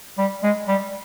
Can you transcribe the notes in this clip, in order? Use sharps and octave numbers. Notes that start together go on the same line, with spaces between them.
G3
G#3
G3